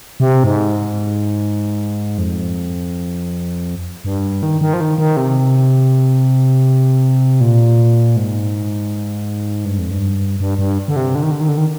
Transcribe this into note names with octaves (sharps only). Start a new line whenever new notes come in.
C3
G#2
F2
G2
D#3
D#3
F3
D#3
D#3
C3
A#2
G#2
G2
F2
G2
G2
G2
D3
C3
D3
D#3
D3
D#3
D3
D#3